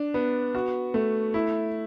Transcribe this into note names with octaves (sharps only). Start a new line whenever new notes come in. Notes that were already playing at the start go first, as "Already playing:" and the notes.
Already playing: D4
B3
F#4
A3
E4